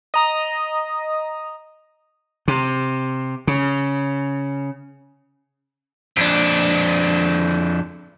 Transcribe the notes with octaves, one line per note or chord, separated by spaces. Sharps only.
D#5 A#5 D#6
C3
C#3
F2 D4